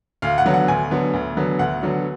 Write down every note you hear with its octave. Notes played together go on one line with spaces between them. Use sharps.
D2 F5
F#5
D3 F#3 B3
F#5
D2 G#5
D3 F#3 B3
D2
D3 F#3 B3
D2 F#5
D3 F#3 B3